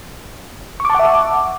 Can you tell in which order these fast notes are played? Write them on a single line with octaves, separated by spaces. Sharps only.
C#6 D6 A5 F#5 E5